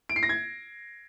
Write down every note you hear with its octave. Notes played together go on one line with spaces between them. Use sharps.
D7
C7
A#6
G#6